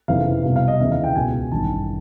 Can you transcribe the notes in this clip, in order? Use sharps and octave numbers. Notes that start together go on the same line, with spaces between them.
F1 F2 C#3 E3 F5
C2 B2 F5
F5
D#5
D#2 C#3 E3 E5
F5
G5
C#2 B2 G#5
A1 G2 D#3 A5